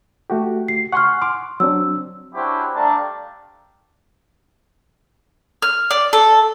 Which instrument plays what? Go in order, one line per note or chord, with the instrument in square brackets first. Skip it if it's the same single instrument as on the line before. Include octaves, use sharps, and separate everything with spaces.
[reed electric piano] A3 F#4 G4
[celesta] C7
[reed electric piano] F#5 G#5 C6 [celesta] C#6 F6
[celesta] C6 [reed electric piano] D6
[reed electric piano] F#3 C4 D4 [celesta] E6
[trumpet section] C#4 D4 E4 F#4 G4 C5
G3 A3 D4 F5 A5 A#5
[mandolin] F6
D5
A4